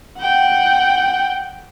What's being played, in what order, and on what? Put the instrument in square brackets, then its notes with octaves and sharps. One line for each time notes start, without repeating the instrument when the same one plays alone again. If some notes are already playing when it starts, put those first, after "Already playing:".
[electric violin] F#5 G5